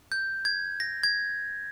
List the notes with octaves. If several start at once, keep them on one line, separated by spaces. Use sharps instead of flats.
G6
G#6
A#6
G#6